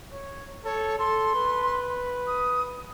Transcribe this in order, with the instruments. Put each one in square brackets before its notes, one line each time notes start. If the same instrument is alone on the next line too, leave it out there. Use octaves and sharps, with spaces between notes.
[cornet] C#5
[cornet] A4 [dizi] C#5
[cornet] A4 [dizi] C6
[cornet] B4
[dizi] D#6